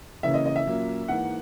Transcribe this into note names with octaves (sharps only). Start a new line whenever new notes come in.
C#3 E3 A#3 C#4 E5
D#5
D#5
E5
A#2 F#3 A#3 C#4
G#2 E3 A#3 F#5